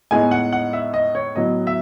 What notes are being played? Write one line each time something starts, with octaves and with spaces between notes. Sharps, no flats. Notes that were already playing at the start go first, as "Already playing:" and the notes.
A2 G#3 B3 D#4 G#5
F#5
F#5
E5
D#5
C#5
A2 F#3 B3 D#5
E5